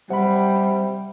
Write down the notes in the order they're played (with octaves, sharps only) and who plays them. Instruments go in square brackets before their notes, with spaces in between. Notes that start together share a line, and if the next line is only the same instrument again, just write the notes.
[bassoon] C3 [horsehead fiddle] G3 [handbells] F#5 B5